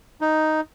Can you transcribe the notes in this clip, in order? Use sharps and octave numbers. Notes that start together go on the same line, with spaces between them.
D#4